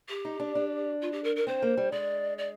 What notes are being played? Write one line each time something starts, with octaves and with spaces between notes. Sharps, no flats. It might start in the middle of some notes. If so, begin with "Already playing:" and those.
G4
D#4
D4
D4
F4
G4
A#4
A#4
C4 C5
A#3
G3
G#3 D5
D5